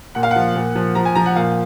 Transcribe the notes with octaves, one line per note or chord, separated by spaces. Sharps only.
A#2 F#5
F5
F#5
F3
A#2
F3
F3 A#5
G#5
F3 A#5
F#5
A#2 F5